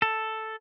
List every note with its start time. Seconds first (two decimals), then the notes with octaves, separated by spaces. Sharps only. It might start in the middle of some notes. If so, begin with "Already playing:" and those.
0.02 A4